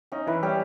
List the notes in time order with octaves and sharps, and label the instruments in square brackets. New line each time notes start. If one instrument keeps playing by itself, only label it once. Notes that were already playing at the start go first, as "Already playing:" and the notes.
[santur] C#4 [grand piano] D#4
[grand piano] E3 E4 [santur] B4
[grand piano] G3 G4 [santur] C#4